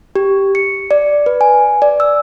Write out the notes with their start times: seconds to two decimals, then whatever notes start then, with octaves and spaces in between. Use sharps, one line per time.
0.15 G4
0.55 C#7
0.91 D5
1.26 B4
1.41 G#5
1.82 D5
2.00 E6